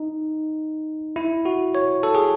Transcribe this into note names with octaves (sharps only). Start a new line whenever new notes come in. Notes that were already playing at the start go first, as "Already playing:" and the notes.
Already playing: D#4
E4
F#4
C#5
A4
G#4